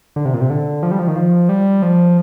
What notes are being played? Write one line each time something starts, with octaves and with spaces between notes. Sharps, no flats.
D3
C3
A#2
C3
D3
F3
G3
F3
D#3
F3
G3
F3